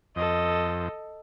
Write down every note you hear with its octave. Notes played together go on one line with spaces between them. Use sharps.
F2 A4 D#5